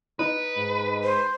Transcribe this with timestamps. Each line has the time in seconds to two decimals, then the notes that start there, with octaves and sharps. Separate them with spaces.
0.19 D#4 B4
0.57 G#2
1.04 C5